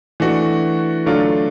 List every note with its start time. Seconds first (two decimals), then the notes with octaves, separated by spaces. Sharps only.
0.20 E3 A3 D4 F#4
1.06 D3 F#3 A3 D4 F4